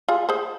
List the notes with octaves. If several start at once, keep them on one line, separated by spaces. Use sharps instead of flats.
F4 G#4
G#4 C5